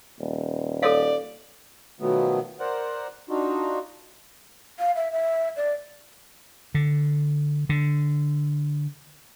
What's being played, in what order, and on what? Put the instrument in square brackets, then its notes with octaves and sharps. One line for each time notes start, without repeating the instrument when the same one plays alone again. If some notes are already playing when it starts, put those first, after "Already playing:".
[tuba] D#1
[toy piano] A4 C#5 F5 [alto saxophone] D5
[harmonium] B2 D#3 F3 F#3 A3 B3
A#4 C5 D5 F#5
D4 D#4 F4 F#4
[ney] F5
E5
E5
D5
[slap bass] D3
D3